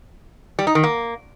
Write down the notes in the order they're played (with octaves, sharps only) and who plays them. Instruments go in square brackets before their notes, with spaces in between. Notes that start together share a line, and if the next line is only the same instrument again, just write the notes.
[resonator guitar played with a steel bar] G3
D#4
D#3
A#3